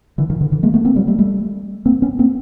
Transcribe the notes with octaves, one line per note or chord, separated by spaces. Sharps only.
D3 E3
D#3 F3
D3 E3
D3 E3
G#3 A#3
A3 B3
A#3 C4
F3 G3
G3 A3
G3 A3
A#3 C4
B3 C#4
A#3 C4